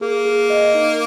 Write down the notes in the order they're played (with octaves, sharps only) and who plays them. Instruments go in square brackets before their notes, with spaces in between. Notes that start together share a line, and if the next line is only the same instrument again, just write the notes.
[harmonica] A#3 [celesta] G#4
[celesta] G#4
D#5
D#4